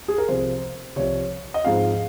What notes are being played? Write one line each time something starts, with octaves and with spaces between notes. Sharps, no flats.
G#4
A#4
C2 C3 F3 C5
C2 C3 F3 C#5
D#5
G#2 F3 G#3 C4 F4 F5